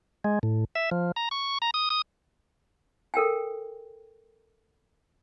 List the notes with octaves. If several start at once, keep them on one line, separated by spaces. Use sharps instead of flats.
G#3
A2
E5
F3
A#5
C#6
A#5
D#6
D#6
A4 A#4 G5 G#5